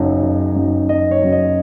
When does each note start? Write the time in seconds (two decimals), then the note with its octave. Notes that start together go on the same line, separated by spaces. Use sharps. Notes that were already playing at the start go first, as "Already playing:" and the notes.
Already playing: F#1 F#2 C#3 F#3 D#4
0.23 F#1
0.55 F#2 C#3 F#3 D#4
0.89 F#1 D#5
1.11 C#5
1.21 F#2 C#3 F#3 D#4
1.32 D#5